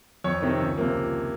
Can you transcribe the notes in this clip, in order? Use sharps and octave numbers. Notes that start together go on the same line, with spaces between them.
F2 C#5
C3 D#3
C#2
C3 F3 A#3